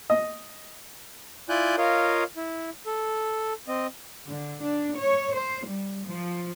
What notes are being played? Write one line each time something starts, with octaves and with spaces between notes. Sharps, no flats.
D#5
E4 F4 D5 G#5 F#6 G6
F4 A#4 C#5 D#5 F5
E4
A4
C4 D#5
D3
D4
C#5
C5
G3
F3